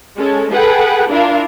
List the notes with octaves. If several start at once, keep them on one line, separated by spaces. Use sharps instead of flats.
G#3 C#4 A4
G#4 A4 B4 F#5 G5
D4 E4 F4 A#4 F5